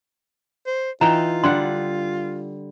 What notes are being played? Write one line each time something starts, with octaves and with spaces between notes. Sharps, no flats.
C5
E3 D#4 F4 G5 A#5
D3 G3 F#5 C6